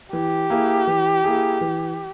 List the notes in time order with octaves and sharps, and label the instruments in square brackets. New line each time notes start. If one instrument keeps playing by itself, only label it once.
[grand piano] E3 [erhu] G4
[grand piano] A#3 E4 G#4
E3
A#3 E4 G#4
E3